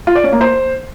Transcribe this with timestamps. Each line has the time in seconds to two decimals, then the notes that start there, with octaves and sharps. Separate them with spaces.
0.07 F4
0.15 D5
0.24 C#4
0.32 A#3
0.41 C5